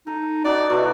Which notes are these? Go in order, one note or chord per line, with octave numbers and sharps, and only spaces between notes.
D#4 A4
D4 D#4 F#4 D5
B2 D4 E4 F#4